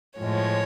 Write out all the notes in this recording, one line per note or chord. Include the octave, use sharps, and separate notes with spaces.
A2 F3 G#3 C#5